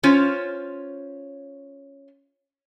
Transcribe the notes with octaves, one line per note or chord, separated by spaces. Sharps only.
C#4 F4 C5 C#5